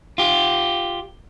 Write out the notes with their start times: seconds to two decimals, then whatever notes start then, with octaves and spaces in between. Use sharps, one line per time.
0.18 F4 G4